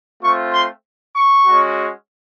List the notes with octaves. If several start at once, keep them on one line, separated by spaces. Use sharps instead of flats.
A3 C4 F4 C#6
C6
C#6
G#3 C#4 F#4